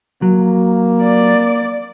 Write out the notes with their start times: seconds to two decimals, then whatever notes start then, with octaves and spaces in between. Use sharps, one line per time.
0.22 F#3 A#3
1.04 D5